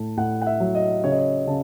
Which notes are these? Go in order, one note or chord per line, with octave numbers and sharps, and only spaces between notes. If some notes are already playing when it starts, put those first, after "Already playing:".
Already playing: A2 A5
A2 F#5
F#5
E5
F#3
D#5
C#3 C#5
D#5
C#5
C#3 A5